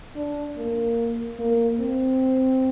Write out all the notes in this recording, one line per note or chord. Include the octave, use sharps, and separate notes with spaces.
D4
A#3
A#3
C4